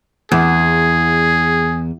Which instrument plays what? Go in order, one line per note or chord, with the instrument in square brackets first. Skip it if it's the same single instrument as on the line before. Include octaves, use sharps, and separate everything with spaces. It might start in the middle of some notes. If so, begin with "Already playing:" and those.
[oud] E2 [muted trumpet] G#4